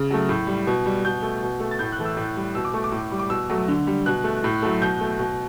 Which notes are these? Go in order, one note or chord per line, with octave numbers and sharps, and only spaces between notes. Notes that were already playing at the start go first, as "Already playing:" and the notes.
Already playing: C#3
F#3 A3
A2
G3
B2
G3
B2 G6
A3
B2
A3
A6
A2 G6
F#6
E3 A3
E6
A2
G3
B2 E6
D6
A3 C#6
D6
A2
G3
D6
B2 E6
F#3 A3
D3
G3
B2 F#6
A3
A2
F#3 A3
B2 G6
A3
B2